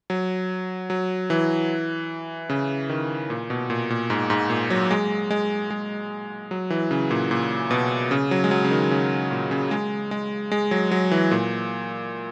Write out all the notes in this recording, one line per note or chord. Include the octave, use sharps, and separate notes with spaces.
F#3
F#3
E3
C#3
D#3
A#2
B2
A#2
A#2
G#2
G#2
A#2
F#3
G#3
G#3
G#3
F#3
E3
C#3
A#2
A#2
B2
C#3
F#3
G#3
F#3
C#3
D#3
C#3
A#2
C#3
G#3
G#3
G#3
F#3
F#3
E3
A#2